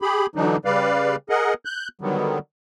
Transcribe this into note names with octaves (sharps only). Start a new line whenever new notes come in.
G4 G#4 B5
D3 E3 F#3 D4 D#4
C#3 G3 B4 D5 F5
G#4 A#4 D#5 F#5
F#6 G6
D3 D#3 F#3 G3 B3